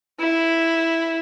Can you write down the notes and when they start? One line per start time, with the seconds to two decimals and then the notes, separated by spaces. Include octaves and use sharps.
0.20 E4